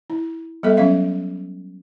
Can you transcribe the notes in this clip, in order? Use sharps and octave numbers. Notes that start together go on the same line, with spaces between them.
E4
G3 B3 A4 E5
F#3 C#4 E5 F5